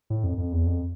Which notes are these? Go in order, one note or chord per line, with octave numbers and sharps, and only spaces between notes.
A2
F2
F2
E2
F2